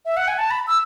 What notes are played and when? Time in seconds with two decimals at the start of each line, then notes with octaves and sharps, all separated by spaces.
0.05 E5
0.17 F#5
0.28 G#5
0.38 A5
0.51 B5
0.67 E6